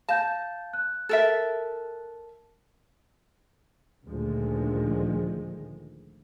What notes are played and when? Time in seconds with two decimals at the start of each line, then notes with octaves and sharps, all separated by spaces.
0.09 F5 A5 G6
0.73 F#6
1.09 A4 A#4 E5
4.09 D2 A#2 D#3 F3 G#3